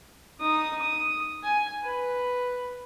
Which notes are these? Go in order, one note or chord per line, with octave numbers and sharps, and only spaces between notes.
D#4 D#6
D#6
G#5
B4